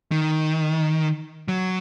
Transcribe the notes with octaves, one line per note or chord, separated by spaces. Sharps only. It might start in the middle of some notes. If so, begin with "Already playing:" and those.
D#3
F#3